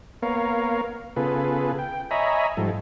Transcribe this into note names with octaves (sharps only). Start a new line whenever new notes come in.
A#3 B3 A#4 C#5 F5
C#3 B3 F4 G#4 A4 B4
G5
C#5 D#5 E5 G#5 A#5 B5
G#2 F3 G3 A4